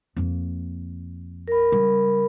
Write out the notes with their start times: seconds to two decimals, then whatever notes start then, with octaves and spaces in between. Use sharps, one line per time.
0.16 F2 A#3
1.48 A#4 B5
1.72 C#3 G3